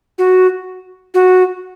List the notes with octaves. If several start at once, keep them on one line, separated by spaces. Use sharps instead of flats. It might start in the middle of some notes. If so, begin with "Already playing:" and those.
F#4
F#4